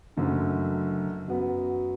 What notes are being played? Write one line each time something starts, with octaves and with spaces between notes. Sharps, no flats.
F#1 F#2 D3 A3
F#2 F#3 B3 F#4